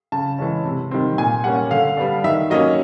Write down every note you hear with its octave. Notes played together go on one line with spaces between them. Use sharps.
C#3 A5
E3 G#3 C#4
C3
D#3 G3 C4
A#2 G#5
G3 A#3 C#4 F#5
D3 F5
G3 B3 D4
D#3 E5
F#3 A#3 C#4 D#5